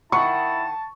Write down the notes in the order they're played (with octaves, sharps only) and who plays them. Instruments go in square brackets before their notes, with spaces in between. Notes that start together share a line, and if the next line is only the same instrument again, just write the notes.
[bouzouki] D#3 F#5 G5 [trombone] E4 [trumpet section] A5 [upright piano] C#6